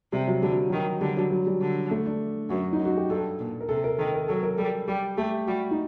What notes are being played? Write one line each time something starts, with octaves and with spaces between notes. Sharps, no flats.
C3 G3
F#3
D3 G3
F#3
D#3 F#3
D3 G3
F#3
F#3
G3
D3
A3
D4
F#2 F#4
D#4
F#2
F#4
G4
G2 A4
A#2
A#4
C3 A4
A#4
D#3 A4
A#4
F#3 A4
A#4
G3 A4
G3 G4
A3 G4
G3 F#4
D#4